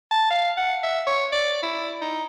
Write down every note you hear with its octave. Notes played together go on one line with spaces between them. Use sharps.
A5
F5
F#5
E5
C#5
D5
E4
D#4